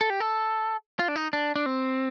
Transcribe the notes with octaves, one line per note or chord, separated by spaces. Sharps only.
A4
G4
A4
F4
D4
D#4
D4
D4
C4